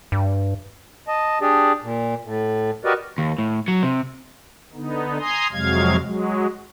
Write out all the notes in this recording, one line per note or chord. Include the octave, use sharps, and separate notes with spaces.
G2
D#5 A5
D4 G4 G#4 D5
A#2
A2
F#4 G4 A#4 B4 D5 D#5
D#2
A2
F#3
C3
D3 B3 D#4
G#5 A#5 C6 D#6
F2 C3 F#3 G#3 F5 G#6
F#3 G#3